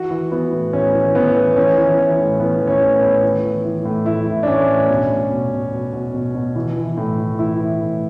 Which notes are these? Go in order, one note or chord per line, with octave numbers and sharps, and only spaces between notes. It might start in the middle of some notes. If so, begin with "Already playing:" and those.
Already playing: E3 F#4
E3
E3 B3
A2
A2 C#4
E3
E3 B3
E3
E3 C#4
E3
E3
A2
E3 B3
E3
C#4
A2
B3
A2
E3
E3
E3
A2
A2 E4
A2
D4
E3 C#4
A2
B2
B2
B2
B2
B2
B2
B2
B2
E3
E3
A2
E3
E3 E4
E3
A2